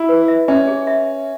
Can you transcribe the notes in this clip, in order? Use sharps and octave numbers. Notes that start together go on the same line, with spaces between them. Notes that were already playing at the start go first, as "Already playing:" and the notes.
Already playing: E4
B4
E5
C#4 E5
G#4
E5